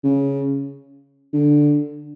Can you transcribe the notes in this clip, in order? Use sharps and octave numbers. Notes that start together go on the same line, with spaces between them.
C#3
D3